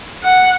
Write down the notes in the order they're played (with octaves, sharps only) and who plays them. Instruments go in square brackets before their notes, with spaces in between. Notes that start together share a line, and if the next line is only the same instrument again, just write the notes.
[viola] F#5